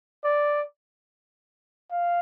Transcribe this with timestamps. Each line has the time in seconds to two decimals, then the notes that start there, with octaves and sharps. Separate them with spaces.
0.24 D5
1.92 F5